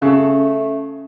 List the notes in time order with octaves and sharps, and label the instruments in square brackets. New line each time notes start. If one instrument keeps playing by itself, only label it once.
[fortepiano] C#3 A4 [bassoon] A3 [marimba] C#4